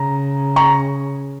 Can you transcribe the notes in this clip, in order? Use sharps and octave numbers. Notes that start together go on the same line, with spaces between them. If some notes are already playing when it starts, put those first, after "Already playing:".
Already playing: C#3 A#5
A#5 C#6